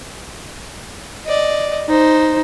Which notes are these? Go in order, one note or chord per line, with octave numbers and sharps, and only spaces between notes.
D5 D#5
D#4 C5